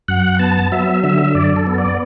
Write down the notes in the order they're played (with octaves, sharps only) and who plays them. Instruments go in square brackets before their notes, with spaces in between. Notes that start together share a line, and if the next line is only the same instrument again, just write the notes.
[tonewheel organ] F#2 F#5
B3 A5
F#3 E5
D3 E5
F#2 D5
A4
B3
D5